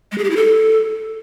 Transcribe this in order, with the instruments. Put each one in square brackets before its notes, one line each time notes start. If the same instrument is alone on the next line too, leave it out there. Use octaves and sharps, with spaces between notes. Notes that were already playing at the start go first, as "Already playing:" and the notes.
[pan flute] G#3
G#4
G4
E4
A4